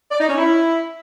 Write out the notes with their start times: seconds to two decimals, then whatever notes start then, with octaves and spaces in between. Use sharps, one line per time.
0.11 D5
0.20 D#4
0.29 C#4
0.38 E4